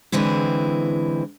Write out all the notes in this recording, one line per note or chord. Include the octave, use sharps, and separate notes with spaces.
D3 E3 G#3 C4 E4